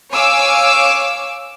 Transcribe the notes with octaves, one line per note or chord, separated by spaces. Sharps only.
C#5 F5 G#5 D6 E6